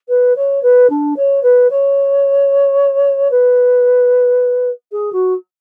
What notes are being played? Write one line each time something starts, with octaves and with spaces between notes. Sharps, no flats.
B4
C#5
B4
D4
C#5
B4
C#5
B4
G#4
F#4